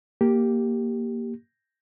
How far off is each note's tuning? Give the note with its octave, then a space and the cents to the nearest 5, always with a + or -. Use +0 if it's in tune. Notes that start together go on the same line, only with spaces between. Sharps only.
A#3 +0 G4 +0